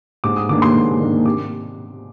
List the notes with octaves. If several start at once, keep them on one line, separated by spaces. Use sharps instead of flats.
G#2 D6
D#6
D#3 A#3 D4 D6
C6
G#2
D#3 A#3 D4
C3 D6